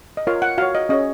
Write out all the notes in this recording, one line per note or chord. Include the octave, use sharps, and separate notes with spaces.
D#5
F4 A#4 C#5 F5
F#5
F#4 C#5 F5
D#5
C#4 G#4 C#5 D#5